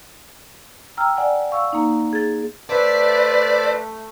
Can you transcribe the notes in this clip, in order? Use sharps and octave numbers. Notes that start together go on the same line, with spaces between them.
G5 A#5 E6 F6
D5 F#5 G#5
F5 C#6 E6
A#3 D#4
G#4 A6
A3 B4 C5 D5 E5 A5